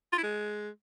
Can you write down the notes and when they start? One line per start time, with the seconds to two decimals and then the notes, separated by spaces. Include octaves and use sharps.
0.12 F4
0.18 E4
0.23 G#3